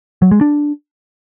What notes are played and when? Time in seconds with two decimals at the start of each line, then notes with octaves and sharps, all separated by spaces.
0.22 F#3
0.31 G#3
0.41 D4